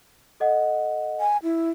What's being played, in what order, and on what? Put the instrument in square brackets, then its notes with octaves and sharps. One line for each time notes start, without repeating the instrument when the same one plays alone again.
[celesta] A4 D#5 F#5
[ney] G#5
E4